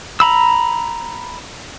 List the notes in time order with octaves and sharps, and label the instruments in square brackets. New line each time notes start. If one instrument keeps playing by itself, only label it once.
[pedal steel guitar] A#5 B5 E6